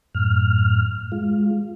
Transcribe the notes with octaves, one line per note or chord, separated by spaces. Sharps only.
F#2 A2 F6
G#3 F4